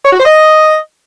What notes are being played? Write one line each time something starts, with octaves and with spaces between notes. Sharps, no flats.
C#5
F#4
C5
D#5